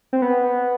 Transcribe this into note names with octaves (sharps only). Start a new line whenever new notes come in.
C4
B3